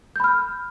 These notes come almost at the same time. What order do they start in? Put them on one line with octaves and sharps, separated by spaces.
G6 B5 F6